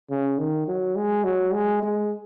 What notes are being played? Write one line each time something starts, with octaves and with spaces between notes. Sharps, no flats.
C#3
D#3
F#3
G#3
F#3
G#3
G#3